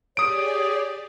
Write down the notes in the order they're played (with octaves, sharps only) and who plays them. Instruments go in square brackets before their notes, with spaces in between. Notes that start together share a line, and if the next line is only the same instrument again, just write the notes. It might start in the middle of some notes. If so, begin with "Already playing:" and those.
[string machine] G4 G#4 D5 [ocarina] C#5 [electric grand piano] D#6 D7